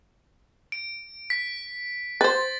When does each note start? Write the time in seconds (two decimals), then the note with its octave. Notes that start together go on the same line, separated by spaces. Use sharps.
0.72 D7
1.30 B6
2.21 B4 C5 A6